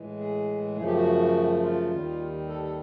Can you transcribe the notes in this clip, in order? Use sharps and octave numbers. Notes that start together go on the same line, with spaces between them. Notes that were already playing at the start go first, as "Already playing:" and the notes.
Already playing: A2 E3 G#3
G#4
F#2 C#3 F3 A3 G#4
G4
F#4
F4
D#2 D#3 G3
A4
A4